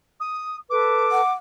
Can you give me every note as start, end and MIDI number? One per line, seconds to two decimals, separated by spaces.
0.20 0.56 87
0.70 1.21 69
0.70 1.21 71
0.70 1.33 86
1.12 1.32 78